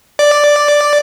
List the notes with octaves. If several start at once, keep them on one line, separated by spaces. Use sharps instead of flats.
D5